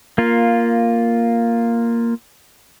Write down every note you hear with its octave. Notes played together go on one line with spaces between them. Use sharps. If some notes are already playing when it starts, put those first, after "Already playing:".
A#3 F4